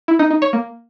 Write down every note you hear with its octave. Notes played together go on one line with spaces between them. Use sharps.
E4
D#4
D#4
C#5
A#3